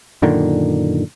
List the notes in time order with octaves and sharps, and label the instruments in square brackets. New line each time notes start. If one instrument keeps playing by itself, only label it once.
[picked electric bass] F#2 A#2 D3 D#3